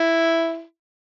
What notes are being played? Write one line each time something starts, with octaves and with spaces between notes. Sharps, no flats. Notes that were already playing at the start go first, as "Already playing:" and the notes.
Already playing: E4